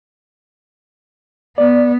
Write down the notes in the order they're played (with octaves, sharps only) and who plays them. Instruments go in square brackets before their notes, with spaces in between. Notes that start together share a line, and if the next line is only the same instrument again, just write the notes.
[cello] B3 [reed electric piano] D5